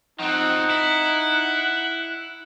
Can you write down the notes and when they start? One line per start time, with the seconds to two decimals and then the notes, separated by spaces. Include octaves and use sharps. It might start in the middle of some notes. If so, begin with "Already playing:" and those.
0.20 F3 C4 D#4 F#5
0.70 E4